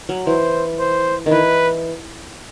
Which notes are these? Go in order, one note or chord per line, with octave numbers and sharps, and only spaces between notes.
F#3
E3 C5
C5
D#3
E3 B4